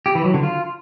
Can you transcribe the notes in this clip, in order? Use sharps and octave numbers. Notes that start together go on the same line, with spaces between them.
G4
E3
F#3
D3
F4